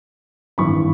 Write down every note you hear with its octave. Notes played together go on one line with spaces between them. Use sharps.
G#1 G2 E3 B5 C#6